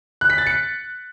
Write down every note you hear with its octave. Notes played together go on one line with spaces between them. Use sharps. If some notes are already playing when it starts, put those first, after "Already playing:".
F#6
B6
A6
C#7